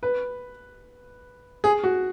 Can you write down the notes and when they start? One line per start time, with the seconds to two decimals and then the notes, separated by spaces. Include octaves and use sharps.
0.03 B4
1.64 G#4
1.84 F#4